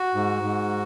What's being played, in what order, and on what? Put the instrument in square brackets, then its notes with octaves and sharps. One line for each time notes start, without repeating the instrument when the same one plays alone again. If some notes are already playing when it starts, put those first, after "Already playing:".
Already playing: [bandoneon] F#4
G#2
G#2